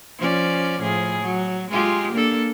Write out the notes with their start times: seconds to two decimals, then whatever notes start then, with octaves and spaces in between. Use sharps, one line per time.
0.18 F3 C#4 D5
0.81 A2 F3 G#4
1.22 F#3
1.71 G#3 F4 G4
2.13 A#3 D4 A4